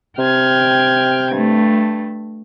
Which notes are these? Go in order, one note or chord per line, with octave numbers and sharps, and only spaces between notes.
C3 G5 F6 G#6
G2 A3